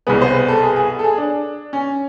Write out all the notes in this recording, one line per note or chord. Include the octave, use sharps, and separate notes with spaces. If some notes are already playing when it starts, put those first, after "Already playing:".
C2 B2 G#3 B3 G#4
C5
B4
A4
G#4
G#4
A4
G#4
D4
C#4